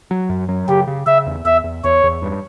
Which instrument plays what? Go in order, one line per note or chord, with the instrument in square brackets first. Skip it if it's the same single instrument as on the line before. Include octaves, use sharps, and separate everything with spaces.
[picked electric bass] F#3
F#2
F#3
[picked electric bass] C#3 [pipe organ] G4
[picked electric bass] C#3
[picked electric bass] C#3 [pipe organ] E5
[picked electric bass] E2
[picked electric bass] E2 [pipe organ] E5
[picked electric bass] E2
[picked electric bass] E2 [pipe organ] C#5
[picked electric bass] E2
G2